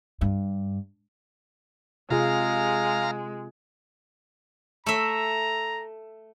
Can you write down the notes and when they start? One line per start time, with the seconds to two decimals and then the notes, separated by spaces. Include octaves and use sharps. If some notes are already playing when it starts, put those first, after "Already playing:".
0.21 G2
2.10 C3 G#3 F4 G#4 F5 A#5
4.86 A3 E5 A#5